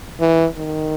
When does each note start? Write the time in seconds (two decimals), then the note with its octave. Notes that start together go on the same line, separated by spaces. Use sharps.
0.20 E3
0.57 D#3